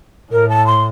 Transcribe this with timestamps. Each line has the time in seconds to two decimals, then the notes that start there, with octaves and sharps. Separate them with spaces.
0.32 A2 A#4
0.49 A5
0.66 C6